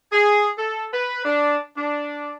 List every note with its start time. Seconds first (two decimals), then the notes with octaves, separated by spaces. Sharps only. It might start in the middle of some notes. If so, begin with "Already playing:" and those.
0.13 G#4
0.59 A4
0.94 B4
1.25 D4
1.78 D4